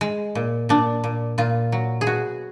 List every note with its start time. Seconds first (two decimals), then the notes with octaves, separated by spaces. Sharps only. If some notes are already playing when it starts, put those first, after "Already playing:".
0.01 G#3
0.35 A#2
0.69 A#2 D4
1.04 A#2
1.38 A#2 F4
1.72 F#3
2.01 G#4
2.06 B2 F#4